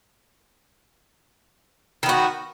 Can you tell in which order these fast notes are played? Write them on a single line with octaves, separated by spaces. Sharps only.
D#3 B3 F#4